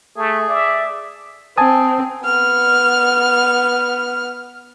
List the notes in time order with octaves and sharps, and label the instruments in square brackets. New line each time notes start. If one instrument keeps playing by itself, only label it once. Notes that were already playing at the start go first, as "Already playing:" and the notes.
[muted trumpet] A3 [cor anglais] G#4
[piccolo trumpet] D5 [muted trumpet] E5
[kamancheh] C4 [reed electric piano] G#5 A5 D#6
[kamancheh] B3 F6